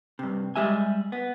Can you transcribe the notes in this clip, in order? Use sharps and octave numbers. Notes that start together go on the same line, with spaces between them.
G2 C3
G3 G#3 G4 E5 G#5
B3